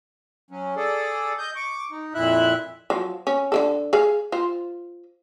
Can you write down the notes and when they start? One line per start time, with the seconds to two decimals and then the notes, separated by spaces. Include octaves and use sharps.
0.51 F#3 C#4
0.76 G#4 A4 D5
1.38 D#5 G6
1.56 C#6 D6
1.91 D#4
2.14 F2 A#2 E4 E5 F#6
2.90 F3 F#3
3.27 C#4
3.52 D3 G#3 A4
3.93 G#4 F5
4.32 F4 C5